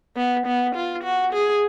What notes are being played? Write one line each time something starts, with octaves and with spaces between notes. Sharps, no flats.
B3
B3
F4
F#4
G#4